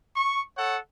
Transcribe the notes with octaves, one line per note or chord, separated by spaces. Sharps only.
C#6
A4 C#5 F#5